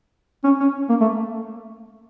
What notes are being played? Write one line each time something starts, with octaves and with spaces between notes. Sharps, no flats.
C#4
C#4
A#3
A3